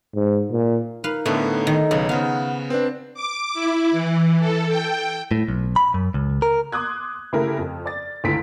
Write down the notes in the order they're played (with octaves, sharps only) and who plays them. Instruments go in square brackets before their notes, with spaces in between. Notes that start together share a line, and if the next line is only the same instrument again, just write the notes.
[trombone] G#2
A#2
[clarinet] D#4 [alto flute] A#4 [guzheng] B4 F5
[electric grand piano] A2 D3 B3 [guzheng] A3 C#4
[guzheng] D#3 [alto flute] A4
[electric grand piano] B1 B3 [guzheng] C#3
[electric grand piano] C#3 B3 [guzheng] C5 F5 [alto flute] F#5
[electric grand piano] C4 D4 [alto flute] B4
[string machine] D6
E4
E3
A4
G5
[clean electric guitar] A2
B1
B5
F#2
C#2
A#4
[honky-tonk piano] C6 D6 D#6 F#6 G#6
C#3 A3 E4 G4 A#4 F6
F2
D5 A6
C#2 D3 E3 A3 B6 D7